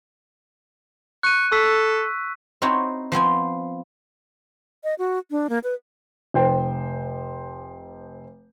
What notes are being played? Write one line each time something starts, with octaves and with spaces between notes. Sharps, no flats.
C#6 F#6 D#7
A4 C#6 E6 B6
C4 D#4 E4 F#4 C#5
F3 B3 C4 G#5
D#5
F#4
D4
A#3
B4
F1 C5 G5